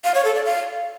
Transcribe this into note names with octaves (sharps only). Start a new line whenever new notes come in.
F5
C#5
A4
D5
F5